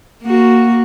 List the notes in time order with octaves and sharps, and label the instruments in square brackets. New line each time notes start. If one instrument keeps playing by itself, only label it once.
[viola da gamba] A#3 F#4